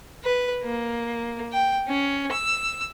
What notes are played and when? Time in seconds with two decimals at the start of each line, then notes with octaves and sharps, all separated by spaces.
0.24 B4
0.63 A#3
1.52 G5
1.88 C#4
2.32 E6